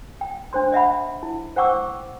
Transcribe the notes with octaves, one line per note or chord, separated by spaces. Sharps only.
G5
D4 C5 C6
D#5 E5 F#5 B5
E4
C5 F#5 G5 C#6 D6 E6